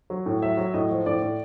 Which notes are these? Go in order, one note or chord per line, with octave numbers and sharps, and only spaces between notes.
F#3
A2
F#3 E5
F#3
A2 D#5
F3
A2 D5
A2